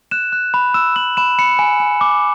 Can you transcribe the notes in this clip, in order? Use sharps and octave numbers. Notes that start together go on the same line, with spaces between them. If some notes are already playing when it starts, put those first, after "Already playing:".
F#6 E7
F#6
B5
E6 E7
E6 F#7
B5 E7
B5 C#7
G#5
G#5
D6